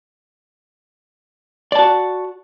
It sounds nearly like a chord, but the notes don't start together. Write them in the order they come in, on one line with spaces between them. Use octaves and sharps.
D5 A5 F#4